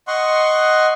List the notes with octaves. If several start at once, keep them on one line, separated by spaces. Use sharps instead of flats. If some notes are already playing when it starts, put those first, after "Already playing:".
D#5 F#5 C6 C#6